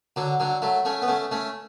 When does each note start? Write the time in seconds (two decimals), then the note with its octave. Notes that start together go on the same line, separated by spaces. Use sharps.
0.16 D3 F#3
0.40 D3 F#3
0.62 F#3 A3
0.85 A3 C#4
1.02 B3
1.08 A3 C#4
1.31 A3 C#4